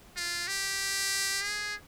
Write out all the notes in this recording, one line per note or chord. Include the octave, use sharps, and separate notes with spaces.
F4
G4
G#4